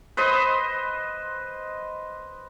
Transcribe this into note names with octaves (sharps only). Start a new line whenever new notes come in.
B4 C5 D#5